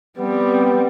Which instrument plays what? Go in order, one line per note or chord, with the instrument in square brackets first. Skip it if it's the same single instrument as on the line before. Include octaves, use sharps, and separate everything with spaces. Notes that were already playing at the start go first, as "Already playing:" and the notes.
[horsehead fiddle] G3 C4 [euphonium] B3